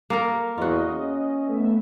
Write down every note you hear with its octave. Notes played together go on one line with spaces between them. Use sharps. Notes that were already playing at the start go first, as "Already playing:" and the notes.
A#3 A4 A#4
E2 F4 F#4 D#5
C#4
A3 B3 E5